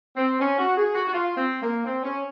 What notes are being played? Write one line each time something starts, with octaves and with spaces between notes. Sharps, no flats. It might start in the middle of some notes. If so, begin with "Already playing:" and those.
C4
C#4
F#4
G#4
F#4
F#4
F4
C4
A#3
C4
C#4